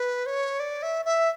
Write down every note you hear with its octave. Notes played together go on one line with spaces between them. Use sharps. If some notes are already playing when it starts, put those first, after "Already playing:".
Already playing: B4
C#5
D5
E5
E5